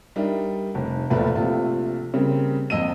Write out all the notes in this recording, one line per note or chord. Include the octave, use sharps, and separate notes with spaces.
G3 D4 D#4 A#4 E5
F1
E1 A#1 A3 B4
A#1 C3 A3 F4
C#3 G3 A#3 C4
A#1 F2 D#5 E6 D#7